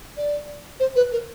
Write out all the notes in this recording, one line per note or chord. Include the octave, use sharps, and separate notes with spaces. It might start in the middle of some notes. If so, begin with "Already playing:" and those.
D5
C5
B4
A#4